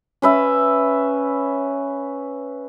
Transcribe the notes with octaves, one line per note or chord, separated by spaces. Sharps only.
C#4 B4 E5